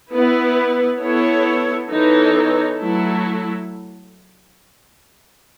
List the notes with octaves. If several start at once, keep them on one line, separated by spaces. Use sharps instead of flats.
B3 E4 B4
B3 E4 A4 C#5
E3 B3 D#4 A4 C#5
F#3 A3 E4 A4